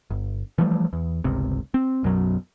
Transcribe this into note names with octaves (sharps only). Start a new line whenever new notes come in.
G1
E3 F3 G3 A3
E2
G1 C#2 C3
C4
B1 F#2 B2 F#3